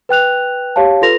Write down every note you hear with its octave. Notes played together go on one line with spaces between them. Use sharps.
B4 G5 F#6 F7
G4 C#5 F5 A5
F4 A4 B4 C6 A#6 F7